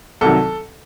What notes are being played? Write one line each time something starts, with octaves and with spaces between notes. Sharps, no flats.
C2 C3 D#3 F#3 A4